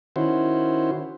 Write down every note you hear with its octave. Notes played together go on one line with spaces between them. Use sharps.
D#3 C#4 E4 F#4 C5